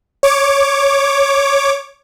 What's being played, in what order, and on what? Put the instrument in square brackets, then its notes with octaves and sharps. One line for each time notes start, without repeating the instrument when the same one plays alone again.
[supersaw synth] C#5 D6